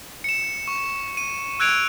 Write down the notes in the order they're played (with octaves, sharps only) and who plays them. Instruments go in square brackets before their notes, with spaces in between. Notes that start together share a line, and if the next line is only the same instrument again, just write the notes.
[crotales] C#7 E7
C#6
D#7
E6 F#6 G#6 D7 F7